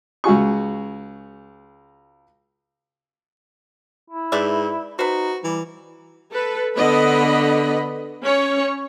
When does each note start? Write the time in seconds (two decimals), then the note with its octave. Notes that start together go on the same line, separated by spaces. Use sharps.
0.24 C#2 F#4 G#4 C#6
4.10 E4
4.32 G#2 B4 D5 E5
4.99 D#4 F#4 B4 C5
5.44 E3 G3
6.31 A4 B4
6.76 D3 B3 D#5 B5
8.23 C#4 C#5